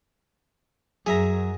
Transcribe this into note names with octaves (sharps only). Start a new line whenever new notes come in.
F#2 F#3 G#4 E5 A#5